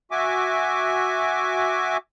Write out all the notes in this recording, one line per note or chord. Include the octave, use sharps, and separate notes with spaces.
F#4 E5 G#5 D6